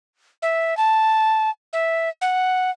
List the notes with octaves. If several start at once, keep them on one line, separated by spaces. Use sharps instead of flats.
E5
A5
E5
F#5